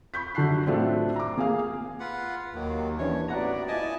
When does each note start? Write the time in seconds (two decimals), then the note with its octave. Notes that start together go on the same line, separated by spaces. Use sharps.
0.14 B5 C#6 G6 B6
0.35 F#2 D3 A5 F#6 C7
0.66 A2 F#3 A3 C4 D4 F4
1.16 A#5 D6
1.38 A#3 G#4 F5
2.00 F4 B4 F#5
2.55 D#2 D#3 F#3 A#3
2.98 E3 C#4 D4 C#5
3.28 A2 B3 F#4 D5 F#5 A#5
3.68 E4 F4 D#5 G#5 A5